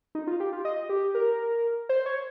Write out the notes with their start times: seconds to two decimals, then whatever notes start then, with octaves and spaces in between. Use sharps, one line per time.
0.15 D#4
0.27 F4
0.40 G4
0.53 F4
0.65 D#5
0.89 G4
1.15 A#4
1.89 C5
2.06 C#5